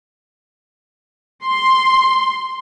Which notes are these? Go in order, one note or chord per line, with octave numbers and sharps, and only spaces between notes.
C6